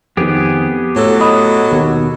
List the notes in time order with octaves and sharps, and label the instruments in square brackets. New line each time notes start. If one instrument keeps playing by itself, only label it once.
[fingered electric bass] F2 D#3 [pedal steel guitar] B3 G4 G#4
[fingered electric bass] A2 [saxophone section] F#3 A4
[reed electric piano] D#5 B5 D#6
[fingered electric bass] D#2 B2 D#3